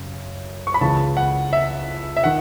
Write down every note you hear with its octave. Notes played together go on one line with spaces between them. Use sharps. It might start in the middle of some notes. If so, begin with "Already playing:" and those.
Already playing: F#2 C#3
C#6
B5
C#2 C#3 E3 G#3 A5
F#5
E5
E5
D#3 F#5